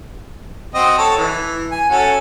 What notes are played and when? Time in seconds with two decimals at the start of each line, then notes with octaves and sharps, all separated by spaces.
0.75 C4 F#4 D#5
0.98 A4 C#5 A5
1.18 E3
1.72 G#5
1.90 C#4 F#4 A4